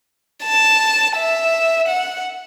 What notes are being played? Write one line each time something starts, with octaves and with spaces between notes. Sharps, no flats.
A5
E5
F#5